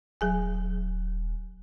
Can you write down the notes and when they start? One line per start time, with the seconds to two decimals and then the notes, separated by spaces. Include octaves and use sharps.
0.21 D#1 F#3 G#4 G#5